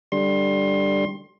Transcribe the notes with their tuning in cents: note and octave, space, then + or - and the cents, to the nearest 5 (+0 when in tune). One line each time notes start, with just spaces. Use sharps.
D3 +0 G3 +0 C6 +25